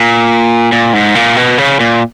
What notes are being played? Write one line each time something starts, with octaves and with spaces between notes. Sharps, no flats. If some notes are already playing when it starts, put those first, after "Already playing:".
Already playing: A#2
A#2
G#2
A#2
B2
C#3
A#2